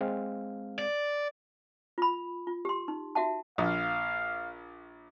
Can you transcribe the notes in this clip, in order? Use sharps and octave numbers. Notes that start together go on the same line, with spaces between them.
G#3 C4 F5
D5
F4 B5
F4
G4 C6
D#4
F#4 E5 F#5 A5
A#1 F5